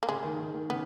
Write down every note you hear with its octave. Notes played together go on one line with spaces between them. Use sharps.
A#3
C#3 G#3
D#3
D#3
D#3
C#3 B3